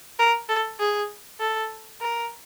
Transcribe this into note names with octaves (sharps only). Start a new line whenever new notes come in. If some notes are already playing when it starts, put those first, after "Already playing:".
A#4
A4
G#4
A4
A#4